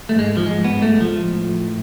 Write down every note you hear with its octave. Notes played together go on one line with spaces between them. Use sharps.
G#2 A3
G#3
F3
G#3
B3
A3
F3
A2